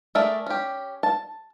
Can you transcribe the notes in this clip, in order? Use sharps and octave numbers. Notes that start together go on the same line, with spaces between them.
A3 G#4 A#4 D5 E5
C#4 G4
A5